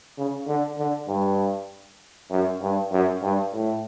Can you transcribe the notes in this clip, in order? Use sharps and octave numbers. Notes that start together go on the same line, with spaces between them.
C#3
D3
D3
G2
F#2
G2
F#2
G2
A2